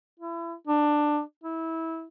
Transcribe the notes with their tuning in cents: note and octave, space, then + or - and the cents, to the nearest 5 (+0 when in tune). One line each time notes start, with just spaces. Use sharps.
E4 +30
D4 +15
E4 -20